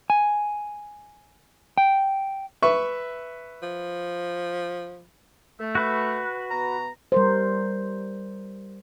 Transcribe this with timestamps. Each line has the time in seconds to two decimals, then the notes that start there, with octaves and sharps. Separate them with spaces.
0.10 G#5
1.78 G5
2.62 B4 E5 C#6
3.62 F3
5.60 A3
5.75 F#4 B4
6.51 B2 B3 A#5
7.12 G3 A#4 C5